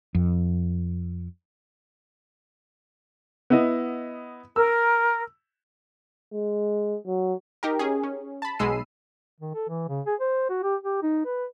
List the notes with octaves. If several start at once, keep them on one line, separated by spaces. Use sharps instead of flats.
F2
B3 E4 D#5
A#4 E6
G#3
F#3
D#4 G4 A#4
C#4 G#4
C#4
A5 B5
B1 G#3 B5 E6 C7 D#7
D#3
A4
E3
C#3
G#4
C5
F#4
G4
G4
D#4
B4